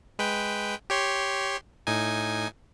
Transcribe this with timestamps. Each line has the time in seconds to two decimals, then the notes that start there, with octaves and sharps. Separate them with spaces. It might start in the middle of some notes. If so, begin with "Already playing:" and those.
0.19 G#3 B4 G5
0.90 G4 C#5 C6
1.87 A2 D#4 G#5